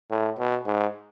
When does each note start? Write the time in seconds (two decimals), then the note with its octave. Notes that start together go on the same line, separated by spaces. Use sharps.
0.10 A2
0.39 B2
0.66 G#2